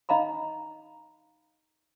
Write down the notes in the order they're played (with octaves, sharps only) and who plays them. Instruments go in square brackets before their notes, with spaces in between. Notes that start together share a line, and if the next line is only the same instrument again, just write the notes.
[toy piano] D#4 D#5 F5 A#5 B5